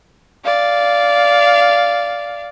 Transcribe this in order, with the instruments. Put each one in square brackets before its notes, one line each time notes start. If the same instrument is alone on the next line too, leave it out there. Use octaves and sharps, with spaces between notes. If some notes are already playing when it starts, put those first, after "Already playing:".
[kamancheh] D5 F5